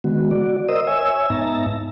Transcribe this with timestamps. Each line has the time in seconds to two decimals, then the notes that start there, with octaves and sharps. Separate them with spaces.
0.04 D3 D#3 G#3 B3 F#4
0.31 F#4 D5
0.69 A#4 C5 D#5 D#6 E6
0.87 C#5 E5 G#5 E6
1.30 G#2 B3 D#4 E5 A5 A#5